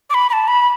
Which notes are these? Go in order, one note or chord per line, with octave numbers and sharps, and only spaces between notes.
D6
B5
B5
A5
B5